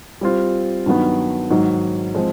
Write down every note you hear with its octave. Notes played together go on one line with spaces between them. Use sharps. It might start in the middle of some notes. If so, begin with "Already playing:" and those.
G3 C4 F4
G2 D#3 F#3 B3
G#2 D#3 F#3
F3 G#3 C4